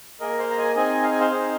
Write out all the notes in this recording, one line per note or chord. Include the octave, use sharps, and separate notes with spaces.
A#3 G#4 A#4 D#5
C5 F5
A#5
D#5 G#5
C4 D#4 G#4 D#5 G#5
F5
G#5
C5 F5
C4 D#4 G#4